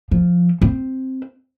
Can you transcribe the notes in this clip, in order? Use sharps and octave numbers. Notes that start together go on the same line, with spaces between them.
F3
C4